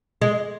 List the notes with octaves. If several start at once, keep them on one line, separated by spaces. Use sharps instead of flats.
G#3